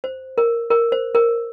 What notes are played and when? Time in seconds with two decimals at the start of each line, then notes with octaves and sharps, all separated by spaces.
0.04 C5
0.38 A#4
0.71 A#4
0.92 C5
1.15 A#4